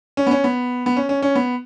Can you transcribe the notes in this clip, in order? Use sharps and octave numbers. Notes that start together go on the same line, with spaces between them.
C#4
B3
C#4
B3
B3
C#4
C#4
C#4
B3